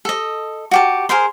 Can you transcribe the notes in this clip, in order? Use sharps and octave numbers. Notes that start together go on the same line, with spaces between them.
A4 D#5
F#4 G4 A5
G#4 A#4 C5 C6